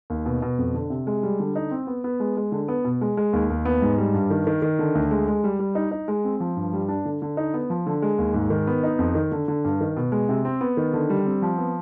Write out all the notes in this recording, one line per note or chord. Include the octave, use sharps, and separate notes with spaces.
D#2
B2
B2
F2
D3
C3
G#3
G3
D3
D#4
C4
B3
B3
G#3
G#3
D3
B3
B2
G#3
G#3
D#2
D#2
B3
G#2
G3
G2
D#3
D#3
D#3
D3
D2
G#3
G#3
G3
G3
D#4
D#4
G#3
C4
F3
G2
G3
D4
D3
D3
D#4
B3
F3
D3
G#3
D#2
G#2
D#3
B3
D#4
F2
D#3
D3
D3
G2
D#3
B2
G#3
C3
C4
B3
D#3
D3
G3
C4
F3
B3